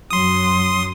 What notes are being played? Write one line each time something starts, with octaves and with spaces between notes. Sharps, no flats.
F#2 F#3 C6 D#6